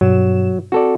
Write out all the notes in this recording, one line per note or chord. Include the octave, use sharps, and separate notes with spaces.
G2 B2 F#3 E7
C4 F#4 A4 D5